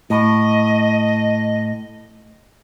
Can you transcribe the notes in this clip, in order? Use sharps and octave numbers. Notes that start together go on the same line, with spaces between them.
A2 D#5